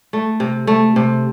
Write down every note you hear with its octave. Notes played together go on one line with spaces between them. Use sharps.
A3
C3
A3
C3